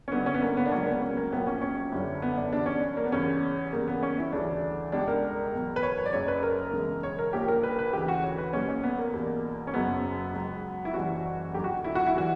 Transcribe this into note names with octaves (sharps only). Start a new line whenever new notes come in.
C#4
G1 G2 D3 B3
C#4
B3
A#3
B3
D4
C#2 C#3 F#3 C#4
A#3
B3
C#4
A#3
A#1 A#2 F#3 B3
C#4
C#4
G1 F#2 D3 G3
B3
D4
E2 B2 G3 D4
C#4
D4
A#3
B3
E2 C#3 G3 C#4
E2 C#3 G3 A#3
B3
C#4
E4
D2 C#3 E3 G3 D4
C#2 B2 G3 D4
A#4
E2 B2 F#3
B4
C#5
C#5
D5
F#1 F#2 C#3 C#5
B4
A#4
E1 E2 C#3
C#5
A#4
A#1 A#2 G3 G4
A#4
B4
B4
D2 C#3 E3 G4
F#4
C#5
B4
B1 A#2 G3 C#4
C#4
B3
A#3
E2 B2 G3
C#4
F#1 F#2 C#3 F#3 B3
C#2 C#3 F#3
E4
F#1 F#2 E3 G3 F#4
D2 D3 F#3 G4
F#4
E4
F#4
E4
E3 G3 F#4